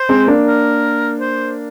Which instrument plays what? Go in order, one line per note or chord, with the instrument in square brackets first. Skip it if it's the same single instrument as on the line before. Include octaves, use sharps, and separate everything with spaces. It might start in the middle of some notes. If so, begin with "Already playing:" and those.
Already playing: [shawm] C5
[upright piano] G#3 C4
A#3 D4
[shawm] A#4
C5